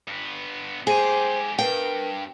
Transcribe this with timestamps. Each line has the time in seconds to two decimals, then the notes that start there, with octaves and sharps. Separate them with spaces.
0.08 G2 B3
0.87 G#2 G4 G#4 C5 G#5 D#7
1.59 G2 A#4 B4 G5